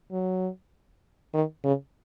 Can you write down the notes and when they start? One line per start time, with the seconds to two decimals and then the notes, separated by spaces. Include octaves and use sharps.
0.12 F#3
1.34 D#3
1.64 C#3